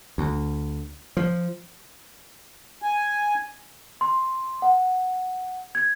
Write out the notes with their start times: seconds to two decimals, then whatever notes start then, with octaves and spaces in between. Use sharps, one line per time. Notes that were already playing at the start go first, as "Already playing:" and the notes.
0.18 D2
1.17 F3
2.82 G#5
4.01 C6
4.62 F#5
5.75 G#6